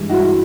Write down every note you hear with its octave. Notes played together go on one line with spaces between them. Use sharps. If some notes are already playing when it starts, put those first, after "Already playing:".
Already playing: G2 E3 G#3
E4 F#4